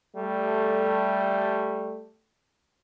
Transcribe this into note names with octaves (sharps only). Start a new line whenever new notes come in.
G3 A3